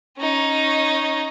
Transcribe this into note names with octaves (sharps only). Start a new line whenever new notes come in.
C#4 D#4